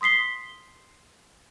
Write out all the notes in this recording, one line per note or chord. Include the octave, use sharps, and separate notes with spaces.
C6 D#6 B6 C7 G7